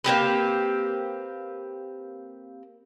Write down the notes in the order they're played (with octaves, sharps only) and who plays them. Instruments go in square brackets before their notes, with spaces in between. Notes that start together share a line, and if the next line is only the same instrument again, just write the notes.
[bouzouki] A#3 C4 G4 B4